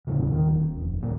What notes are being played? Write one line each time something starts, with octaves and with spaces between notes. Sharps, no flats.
E1 D#2 A2 C#3
D#3
D#1
F1
D1 A#2